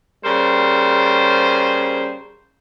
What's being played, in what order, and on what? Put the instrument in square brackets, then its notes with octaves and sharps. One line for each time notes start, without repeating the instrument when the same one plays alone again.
[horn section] C#3 G3 A#3 C5